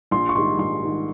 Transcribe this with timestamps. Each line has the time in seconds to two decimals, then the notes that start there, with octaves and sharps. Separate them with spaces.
0.11 A#1 C6
0.29 C#6
0.35 G#2 D#3 G3 C6
0.59 A#1 C6
0.82 G#2 D#3 G3